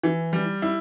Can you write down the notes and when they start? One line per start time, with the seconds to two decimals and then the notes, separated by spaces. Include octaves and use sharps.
0.03 E3
0.33 G3
0.62 E4